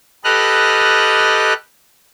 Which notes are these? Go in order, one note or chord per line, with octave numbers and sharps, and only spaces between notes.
G4 A4 B4 D#5 F6 F#6